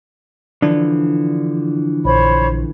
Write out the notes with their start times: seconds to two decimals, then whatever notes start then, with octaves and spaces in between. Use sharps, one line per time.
0.62 D3 E3 F3 D4
2.05 A#1 C5 C#5 B5